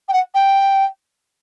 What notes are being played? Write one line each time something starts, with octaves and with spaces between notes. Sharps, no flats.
G5
F#5
G5